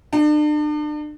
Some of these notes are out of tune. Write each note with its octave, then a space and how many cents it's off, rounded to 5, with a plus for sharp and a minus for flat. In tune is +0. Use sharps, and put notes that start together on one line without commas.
D4 +40